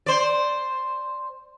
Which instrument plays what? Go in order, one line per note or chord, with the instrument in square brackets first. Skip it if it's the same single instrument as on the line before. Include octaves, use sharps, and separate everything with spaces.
[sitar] C5 D5